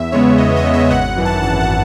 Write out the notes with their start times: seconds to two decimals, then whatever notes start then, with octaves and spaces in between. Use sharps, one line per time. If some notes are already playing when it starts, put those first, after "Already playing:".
Already playing: E2 E5
0.12 C#3 G#3 B3 C#5
0.38 E2 D#5
0.56 D#5
0.64 C#3 G#3 B3
0.74 E5
0.91 G#1 F#5
1.17 F#2 E3
1.25 A5
1.43 G#1 A5
1.60 F#5